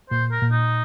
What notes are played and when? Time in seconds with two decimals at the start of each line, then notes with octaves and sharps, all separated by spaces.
0.10 A#2 C5
0.31 A#4
0.42 A#2
0.51 D#4